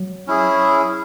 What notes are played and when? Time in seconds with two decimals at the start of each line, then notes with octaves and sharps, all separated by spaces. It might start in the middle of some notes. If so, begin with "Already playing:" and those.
Already playing: F#3
0.27 C#4 E4 G#4